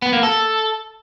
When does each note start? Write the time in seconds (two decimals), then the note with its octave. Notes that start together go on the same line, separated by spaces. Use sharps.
0.02 B3
0.13 A#3
0.23 A4